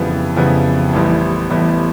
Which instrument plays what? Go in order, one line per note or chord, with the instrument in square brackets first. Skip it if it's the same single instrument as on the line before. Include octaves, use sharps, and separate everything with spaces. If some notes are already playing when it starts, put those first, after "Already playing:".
Already playing: [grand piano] F2 C#3 E3 G3 B3
F2 C#3 E3 G3 B3
A1 A2 E3 G3 B3
A1 A2 E3 G3 B3